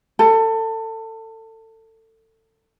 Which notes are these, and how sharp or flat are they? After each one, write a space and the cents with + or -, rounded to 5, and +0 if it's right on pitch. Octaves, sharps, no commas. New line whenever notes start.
A4 +25